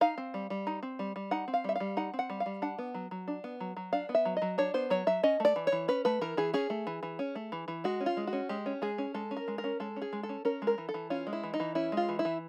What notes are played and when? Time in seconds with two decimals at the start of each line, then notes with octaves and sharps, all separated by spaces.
0.01 D#4 F5
0.18 C4
0.34 G3
0.50 G3
0.67 D#4
0.83 C4
0.99 G3
1.16 G3
1.31 D#4 F#5
1.48 C4
1.54 F5
1.64 G3 E5
1.76 G3 F5
1.97 D#4 F#5
2.14 C4
2.19 F#5
2.30 G3
2.40 F5
2.46 G3
2.62 D4 F#5
2.79 B3
2.94 F#3
3.11 F#3
3.28 D4
3.44 B3
3.60 F#3
3.77 F#3
3.93 D4 F5
4.09 B3
4.15 E5
4.25 F#3
4.37 D#5
4.42 F#3
4.58 D4 C#5
4.74 B3 C5
4.90 F#3 C#5
5.07 F#3 E5
5.23 C#4 D#5
5.40 A3 D5
5.56 E3
5.67 C#5
5.72 E3
5.88 C#4 B4
6.05 A3 B4
6.21 E3 A#4
6.37 E3 G#4
6.54 C#4 G#4
6.70 A3
6.87 E3
7.03 E3
7.19 C#4
7.35 A3
7.52 E3
7.68 E3
7.84 G#3 F#4
8.00 C#4
8.06 F4
8.17 G#3
8.27 F#4
8.33 C#4
8.49 G#3 G4
8.66 C#4
8.82 G#3 G#4
8.98 C#4
9.14 G#3 A4
9.31 C#4
9.37 A#4
9.48 G#3
9.58 A#4
9.64 C#4
9.80 G#3 A4
9.96 C#4
10.02 G#4
10.13 G#3
10.23 A4
10.29 C#4
10.45 C#4 A#4
10.62 G#3
10.67 A#4
10.78 E3
10.89 A4
10.94 E3
11.10 C#4 F4
11.27 G#3
11.33 E4
11.43 E3
11.54 D#4
11.60 E3
11.75 C#4 E4
11.92 G#3 F4
12.09 E3
12.19 E4
12.25 E3